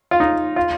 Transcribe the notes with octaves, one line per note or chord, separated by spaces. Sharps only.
F4
D#4
F4